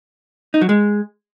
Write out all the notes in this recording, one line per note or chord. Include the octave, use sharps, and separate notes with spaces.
D#4
F#3
G#3